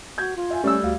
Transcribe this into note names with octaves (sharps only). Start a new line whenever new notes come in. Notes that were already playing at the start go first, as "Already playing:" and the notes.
F#4 G6 G#6
F4
E5 G#5
G3 A3 C#4 E6
D2 F5